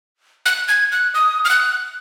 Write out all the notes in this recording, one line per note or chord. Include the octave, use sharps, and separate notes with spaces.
F#6
G#6
F#6
D#6
F6
F#6